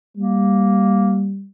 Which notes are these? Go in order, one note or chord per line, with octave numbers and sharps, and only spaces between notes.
G3 A#3